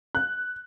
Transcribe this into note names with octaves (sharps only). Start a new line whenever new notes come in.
F#6